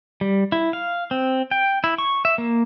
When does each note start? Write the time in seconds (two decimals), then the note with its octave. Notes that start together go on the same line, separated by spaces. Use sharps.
0.21 G3
0.52 E4
0.73 F5
1.11 C4
1.51 G5
1.84 E4
1.98 C#6
2.25 E5
2.38 A#3